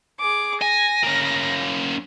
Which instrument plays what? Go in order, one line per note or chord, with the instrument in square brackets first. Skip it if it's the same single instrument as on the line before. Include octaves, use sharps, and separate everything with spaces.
[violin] G#4 D6
[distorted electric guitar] G#5 [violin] A#6
[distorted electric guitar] A#3 C#4